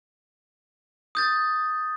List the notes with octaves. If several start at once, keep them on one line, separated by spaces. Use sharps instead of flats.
D#6 G6 A6